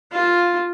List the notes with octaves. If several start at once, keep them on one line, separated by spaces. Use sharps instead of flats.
F4